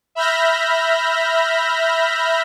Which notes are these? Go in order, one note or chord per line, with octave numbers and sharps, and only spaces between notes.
E5 B5 F6 G6 A#6